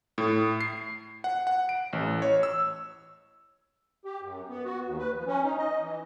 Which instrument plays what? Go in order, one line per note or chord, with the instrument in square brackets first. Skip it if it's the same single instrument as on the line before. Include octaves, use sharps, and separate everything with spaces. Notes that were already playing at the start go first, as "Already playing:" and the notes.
[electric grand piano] A2
C7
F#5
F#5
D7
A1
C#5
E6
[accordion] G4
F#2
B3
F#4
D#2
B4
F3
C#4
D#4
D#5
E3